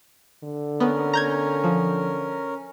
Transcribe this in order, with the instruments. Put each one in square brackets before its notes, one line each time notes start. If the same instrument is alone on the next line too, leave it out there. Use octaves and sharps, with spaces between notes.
[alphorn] D3
[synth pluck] B3 [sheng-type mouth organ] C#4 A#4
[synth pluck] A#5 G6 G#6
F3